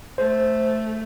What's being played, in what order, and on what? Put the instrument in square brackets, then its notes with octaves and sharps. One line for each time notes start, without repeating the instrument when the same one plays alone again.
[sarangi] A3 [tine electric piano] C5